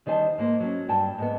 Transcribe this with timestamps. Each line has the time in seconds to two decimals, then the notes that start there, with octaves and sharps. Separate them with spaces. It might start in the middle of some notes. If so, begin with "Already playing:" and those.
0.06 E2 D#3 G3 C5 G#5 A5
0.38 G#2 A#3 C5
0.60 F#3 C#4
0.89 G2 G5 A5
1.18 G#2 B3